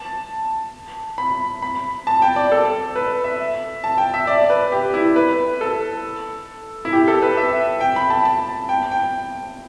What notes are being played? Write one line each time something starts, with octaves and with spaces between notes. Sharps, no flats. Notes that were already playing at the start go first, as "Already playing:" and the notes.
Already playing: A5
B5
B5
A5
G5
D5
A4
B4
E5
A5
G5
E5
D5
B4
G4
E4
B4
A4
E4
G4
A4
B4
E5
G5
B5
A5
A5
G5
G5